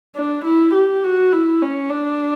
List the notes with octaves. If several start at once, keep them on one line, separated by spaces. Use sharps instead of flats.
D4
E4
G4
F#4
E4
C#4
D4